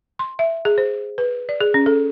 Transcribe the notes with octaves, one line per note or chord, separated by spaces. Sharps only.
C6
E5
G#4
C5
B4
D5
G#4
C#4
A4